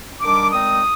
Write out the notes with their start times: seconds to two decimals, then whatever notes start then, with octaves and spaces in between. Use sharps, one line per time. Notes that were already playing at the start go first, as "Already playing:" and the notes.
0.20 D#3 G3 D4 D6
0.51 A#2 G#3 C4 D#4 D#6